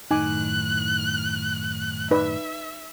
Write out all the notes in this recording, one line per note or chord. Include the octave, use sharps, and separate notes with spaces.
F#2 A2 D#3 D#4 G#5 D6 F#6
D#4 B4 D5 E5